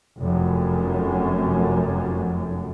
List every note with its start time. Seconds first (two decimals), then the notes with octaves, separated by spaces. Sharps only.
0.19 F1 F#2